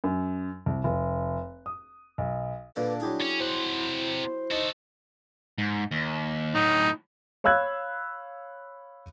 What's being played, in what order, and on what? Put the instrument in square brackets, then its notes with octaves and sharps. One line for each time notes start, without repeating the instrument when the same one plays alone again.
[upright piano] F#2
C2
F1
D#6
B1
[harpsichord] A#2 D3 A#3 [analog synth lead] D4 [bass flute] B4
[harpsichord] F#3 G4 G#4 [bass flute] E4
[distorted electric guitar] C#4
[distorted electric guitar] C3 F#5 [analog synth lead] C5
[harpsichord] D#4 [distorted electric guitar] F#4 A4
[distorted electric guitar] G#2
D#2
[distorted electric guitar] A2 F#3 [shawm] D#4
[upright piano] C#5 F5 B5 E6 F#6 G#6